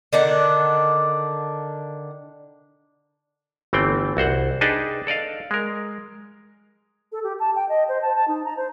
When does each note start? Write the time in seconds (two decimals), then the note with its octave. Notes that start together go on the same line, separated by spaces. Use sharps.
0.13 D3 D#3 D4 F#5
3.73 G1 E3 A3 C4 G5
4.17 C2 F#4 C5 F#5
4.61 D4 D#4 G#4 B4 G5 A5
5.07 A4 D5 D#5 F5
5.51 G#3 A#4
7.12 A4
7.23 G4
7.40 A5
7.55 G5
7.69 D#5
7.89 C5
8.02 A5
8.15 A5
8.28 D#4
8.45 A#5
8.57 C5